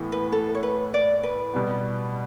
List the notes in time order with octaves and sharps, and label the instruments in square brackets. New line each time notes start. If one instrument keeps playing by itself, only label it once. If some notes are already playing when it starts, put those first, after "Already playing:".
Already playing: [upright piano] A2 E3 B3
[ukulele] B4
A4
C#5
B4
D5
B4
[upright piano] B2 G3 B3